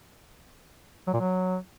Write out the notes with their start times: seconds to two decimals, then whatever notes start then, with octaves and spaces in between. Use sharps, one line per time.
1.07 F#3
1.13 A#2
1.20 F#3